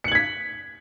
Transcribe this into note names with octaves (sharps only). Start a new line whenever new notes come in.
G#6 B6 C#7 F#7